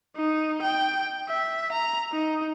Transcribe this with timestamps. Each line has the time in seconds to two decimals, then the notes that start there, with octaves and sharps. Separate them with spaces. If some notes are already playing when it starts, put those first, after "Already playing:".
0.16 D#4
0.62 G5
1.28 E5
1.72 A#5
2.12 D#4